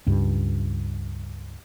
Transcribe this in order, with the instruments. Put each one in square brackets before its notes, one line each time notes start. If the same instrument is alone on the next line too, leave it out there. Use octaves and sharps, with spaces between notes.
[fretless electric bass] C#2 G2